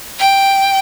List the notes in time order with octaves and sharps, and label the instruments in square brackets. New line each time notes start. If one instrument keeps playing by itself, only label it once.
[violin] G5